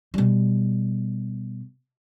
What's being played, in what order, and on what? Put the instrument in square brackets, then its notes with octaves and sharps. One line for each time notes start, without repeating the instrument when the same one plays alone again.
[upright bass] B2 G3